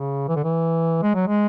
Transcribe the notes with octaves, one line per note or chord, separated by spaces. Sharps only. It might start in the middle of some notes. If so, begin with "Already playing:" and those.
Already playing: C#3
E3
D3
E3
G#3
F#3
G#3